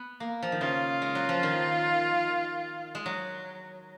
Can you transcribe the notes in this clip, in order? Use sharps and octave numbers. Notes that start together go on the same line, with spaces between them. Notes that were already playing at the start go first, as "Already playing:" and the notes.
Already playing: B3
A#3
F3
D#3
C#3 F4
G#3
F#3
F3
D#3
G#3
F#3